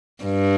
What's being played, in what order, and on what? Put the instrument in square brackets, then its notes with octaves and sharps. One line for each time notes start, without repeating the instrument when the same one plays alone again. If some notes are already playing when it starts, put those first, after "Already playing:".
[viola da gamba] G2